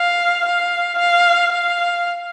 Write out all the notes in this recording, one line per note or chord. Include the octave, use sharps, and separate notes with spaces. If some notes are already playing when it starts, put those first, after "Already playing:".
Already playing: F5
F5
F5
F5